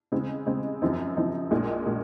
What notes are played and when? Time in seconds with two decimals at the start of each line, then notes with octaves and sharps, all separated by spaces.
0.12 C#3 G#3 C4
0.46 C#3 G#3 C4
0.82 F#2 F3 C4 D#4
1.17 F#2 F3 C4 D#4
1.51 A#1 A#2 G#3
1.86 A#2 G#3